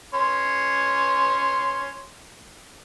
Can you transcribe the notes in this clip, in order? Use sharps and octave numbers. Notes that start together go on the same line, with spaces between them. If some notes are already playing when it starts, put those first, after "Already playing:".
C#4 C6